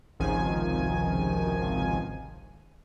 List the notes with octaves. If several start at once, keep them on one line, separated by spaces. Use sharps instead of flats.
G#1 C#2 C3 D#3 F3 G#5